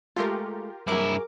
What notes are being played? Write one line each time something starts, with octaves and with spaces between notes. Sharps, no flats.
G#3 A3 F4 G4 A4 A#4
G2 F#3 E4 G#4 A#4 D6